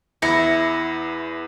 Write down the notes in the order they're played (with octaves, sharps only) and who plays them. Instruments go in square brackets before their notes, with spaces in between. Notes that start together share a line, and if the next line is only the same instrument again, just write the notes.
[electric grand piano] E2 A#6 C#7 [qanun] E4